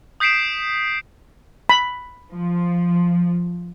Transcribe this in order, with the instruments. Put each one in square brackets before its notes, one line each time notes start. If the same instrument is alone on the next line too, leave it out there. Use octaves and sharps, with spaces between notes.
[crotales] D#6 G6 B6 C7 D7 E7
[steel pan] B5
[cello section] F3